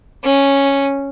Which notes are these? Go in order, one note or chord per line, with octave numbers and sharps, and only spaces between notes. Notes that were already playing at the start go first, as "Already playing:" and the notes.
C#4